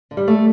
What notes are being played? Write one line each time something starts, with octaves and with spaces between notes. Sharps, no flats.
D3
G3
A3